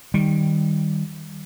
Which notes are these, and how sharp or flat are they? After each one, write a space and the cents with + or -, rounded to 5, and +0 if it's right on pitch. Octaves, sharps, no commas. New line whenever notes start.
D#3 +0 G3 +0